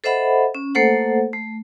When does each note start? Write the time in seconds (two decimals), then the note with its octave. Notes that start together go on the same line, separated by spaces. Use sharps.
0.04 A4 C5 D#5 E5 F#5 B5
0.55 C#4
0.75 A3 A#3 A4 C5 F#5
1.33 A3